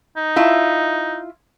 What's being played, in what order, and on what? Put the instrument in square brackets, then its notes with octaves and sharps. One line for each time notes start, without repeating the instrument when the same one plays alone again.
[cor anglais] D#4
[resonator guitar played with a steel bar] E4 F4 E5